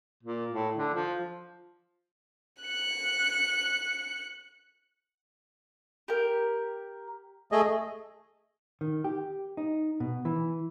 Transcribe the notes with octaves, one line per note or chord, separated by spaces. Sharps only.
A#2
A2
D3
F3
F#6 C#7
G4 A#4
A3 G#4 D#5
D#3
G4
D#4
B2
E3